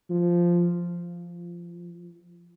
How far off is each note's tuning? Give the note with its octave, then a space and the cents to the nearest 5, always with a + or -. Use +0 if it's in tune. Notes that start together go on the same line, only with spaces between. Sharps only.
F3 -5
F3 -15